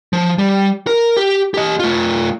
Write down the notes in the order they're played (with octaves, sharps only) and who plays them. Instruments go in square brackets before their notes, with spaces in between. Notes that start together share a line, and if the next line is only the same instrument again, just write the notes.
[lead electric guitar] F3
G3
A#4
G4
G4 D#5
A3 F4